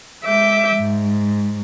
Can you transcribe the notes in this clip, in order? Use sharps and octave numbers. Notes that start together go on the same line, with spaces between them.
G#3 E5 D6 G6
G#2